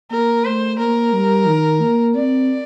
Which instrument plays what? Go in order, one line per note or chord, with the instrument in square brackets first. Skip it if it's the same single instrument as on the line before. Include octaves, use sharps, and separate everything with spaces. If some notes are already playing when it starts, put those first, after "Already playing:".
[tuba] A#3 [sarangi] A#4
[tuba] A3 [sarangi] C5
[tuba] A#3 [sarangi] A#4
[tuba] G3
D#3
A#3
[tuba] C4 [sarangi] D5